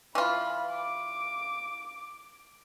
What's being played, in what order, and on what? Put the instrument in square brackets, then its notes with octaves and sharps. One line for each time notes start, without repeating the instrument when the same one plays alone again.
[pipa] E3 F4 [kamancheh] B5
[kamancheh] D6